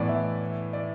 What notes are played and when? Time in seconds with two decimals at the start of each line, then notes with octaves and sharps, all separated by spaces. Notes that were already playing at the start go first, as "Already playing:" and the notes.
Already playing: A2 E3 B3 D5
0.09 E5
0.73 D5